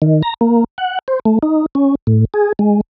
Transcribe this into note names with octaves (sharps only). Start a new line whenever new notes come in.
D#3
A#5
A#3
F#5
C5
A3
D#4
C#4
A2
G#4
G#3